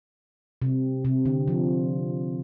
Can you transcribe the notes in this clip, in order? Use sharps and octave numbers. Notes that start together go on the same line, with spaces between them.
C3
C3
D3
F3